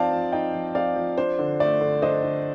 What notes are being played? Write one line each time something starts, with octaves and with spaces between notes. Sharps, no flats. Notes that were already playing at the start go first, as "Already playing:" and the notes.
Already playing: F3 C4 D#4 D5 F5 A5
F3
D#4 D#5 G5
F3
C4 D5 F5
F3
D4 C5
D3
A3 D5
D3
D4 C5 D#5
D3